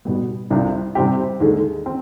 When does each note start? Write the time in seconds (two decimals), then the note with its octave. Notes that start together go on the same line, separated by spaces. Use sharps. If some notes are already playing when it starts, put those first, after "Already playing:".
0.05 B2 G3 B3
0.50 C2 C3 G3 D4 F4
0.95 C3 G3 C4 G4
1.40 D#2 D3 G#3
1.86 C4